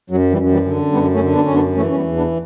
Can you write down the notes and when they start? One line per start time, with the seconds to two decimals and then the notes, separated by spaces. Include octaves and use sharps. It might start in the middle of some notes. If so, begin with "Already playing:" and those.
0.10 F#2 F#3
0.31 E3 G3
0.37 F#2
0.52 E3 G3
0.66 D3
0.92 F#2 G3 B3
1.13 A3 C#4
1.21 D3
1.33 B3 D4
1.45 F#2 C#4
1.54 B3 D4
1.75 E3 A3 C#4
1.90 C#4
1.95 G3 B3
2.02 E2
2.16 B3 D4